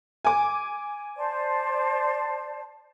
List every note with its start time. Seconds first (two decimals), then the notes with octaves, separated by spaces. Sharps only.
0.25 G#5 D6
1.17 C5 D5 A5